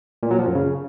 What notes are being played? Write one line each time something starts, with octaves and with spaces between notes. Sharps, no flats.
A#2
F#3
F3
F#2
C#3